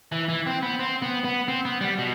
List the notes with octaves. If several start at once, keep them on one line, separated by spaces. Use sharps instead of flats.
E3
E3
C4
B3
C4
B3
B3
C4
B3
G3
B2